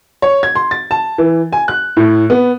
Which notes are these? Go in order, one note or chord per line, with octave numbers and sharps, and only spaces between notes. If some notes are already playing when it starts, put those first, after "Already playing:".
C#5
G#6
C6
A6
A5
E3
G#5
F#6
A2
B3